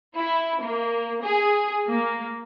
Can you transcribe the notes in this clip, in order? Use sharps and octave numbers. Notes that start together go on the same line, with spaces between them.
E4
A#3
G#4
A#3